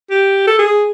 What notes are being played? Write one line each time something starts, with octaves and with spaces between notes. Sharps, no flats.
G4
A4
G#4